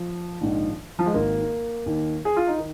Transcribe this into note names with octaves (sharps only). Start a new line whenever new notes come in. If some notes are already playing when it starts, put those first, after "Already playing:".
Already playing: F3
A#1 G#2 D#3
F3
G#3
G#1 G#2 D#3 A#3
D#2 D#3
G#4
F4
D#4
D#3